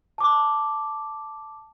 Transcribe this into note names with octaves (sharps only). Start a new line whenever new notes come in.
A5 D6